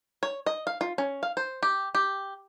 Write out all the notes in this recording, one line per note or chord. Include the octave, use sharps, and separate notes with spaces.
C#5
D#5
F5
F4
C#4
F5
C5
G4
G4